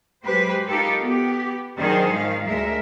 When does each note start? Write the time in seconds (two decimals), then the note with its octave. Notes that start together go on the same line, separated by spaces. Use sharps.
0.23 F#3 G#3 G4 B4 C5
0.66 D#4 F4 G4 A4 A#4
0.99 B3 G4
1.77 D#3 F#3 D4 D#4 G#4 C5
2.09 G#2 D#3 F3 F5
2.46 D2 G#3 A3 A#4 E5